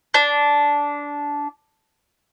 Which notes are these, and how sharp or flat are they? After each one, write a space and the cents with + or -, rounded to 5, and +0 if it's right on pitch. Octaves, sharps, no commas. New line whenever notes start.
D4 -15